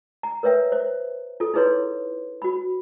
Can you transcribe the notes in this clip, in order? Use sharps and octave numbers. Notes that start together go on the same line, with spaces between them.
A#5
A#4 B4 C#5 E5 G5
C5
F4 A4
D#4 E4 G#4 B4 C#5 C6
F#4 B5